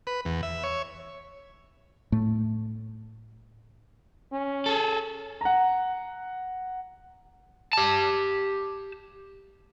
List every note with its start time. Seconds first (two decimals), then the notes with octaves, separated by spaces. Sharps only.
0.07 B4
0.25 E2
0.43 E5
0.64 C#5
2.12 A2 A3
4.32 C#4
4.66 G#4 A4
5.41 F#5 A#5
7.73 G4 A5